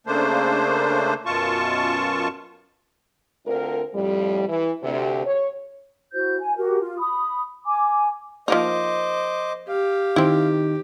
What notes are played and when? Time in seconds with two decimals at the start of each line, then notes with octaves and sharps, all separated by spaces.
0.07 C#3 A3 A#3 D4 C5
1.26 F#2 B2 F4 A5 C#6
3.46 D2 D3 C4 F4 A#4
3.94 F2 A2 G3
4.48 E3
4.83 D2 C3
5.26 C#5
6.13 E4 F#4 C5 G6
6.40 G#5
6.56 F#4 G4 A#4
6.80 F4
6.98 B5 D#6
7.66 G#5 D6
8.48 F3 A#3 D#4 C5 D#5 D6
9.68 G4 F5
10.16 D#3 C4 E4